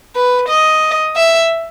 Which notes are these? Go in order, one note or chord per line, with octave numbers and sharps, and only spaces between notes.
B4
D#5
E5